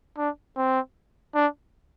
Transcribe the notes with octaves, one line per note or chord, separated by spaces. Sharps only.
D4
C4
D4